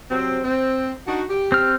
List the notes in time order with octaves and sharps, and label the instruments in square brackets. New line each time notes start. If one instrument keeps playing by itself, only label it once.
[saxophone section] C3 F#3 C4
C4
D4 D#4 F#4
G4
[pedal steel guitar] C4 F6